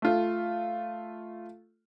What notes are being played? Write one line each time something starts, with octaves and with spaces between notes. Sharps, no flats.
A3 F4